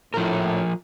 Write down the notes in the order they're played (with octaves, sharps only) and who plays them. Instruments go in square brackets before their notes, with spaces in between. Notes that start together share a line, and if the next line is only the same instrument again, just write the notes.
[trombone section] A2 [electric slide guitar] F3 A#4